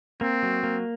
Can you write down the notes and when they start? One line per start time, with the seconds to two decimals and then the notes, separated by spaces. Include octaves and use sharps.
0.21 A#3 C4
0.43 F#3
0.63 A#3